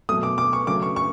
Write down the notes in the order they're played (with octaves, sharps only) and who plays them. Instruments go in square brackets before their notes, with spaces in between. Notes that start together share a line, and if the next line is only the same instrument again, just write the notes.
[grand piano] B2 F#3 A3 D#6
D6
D6
C#6
C#3 F#3 A3 D6
C#6
C#6